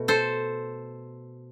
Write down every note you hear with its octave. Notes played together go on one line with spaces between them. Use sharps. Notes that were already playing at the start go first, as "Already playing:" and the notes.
Already playing: B2 A3
A4 C5